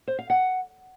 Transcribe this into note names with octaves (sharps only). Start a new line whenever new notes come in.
C5
F5
F#5